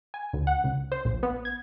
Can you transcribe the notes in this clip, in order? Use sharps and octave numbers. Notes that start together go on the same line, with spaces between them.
G#5
D2
F#5
C#2
C5
A#1
B3
G#6